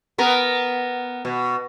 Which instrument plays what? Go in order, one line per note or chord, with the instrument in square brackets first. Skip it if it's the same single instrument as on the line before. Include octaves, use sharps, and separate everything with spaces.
[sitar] B3 A#4
B2